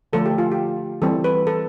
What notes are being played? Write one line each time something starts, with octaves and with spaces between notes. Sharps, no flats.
D3 F3 A3 A4
G4
F4
G4
E3 G3 C4 A4
B4
A4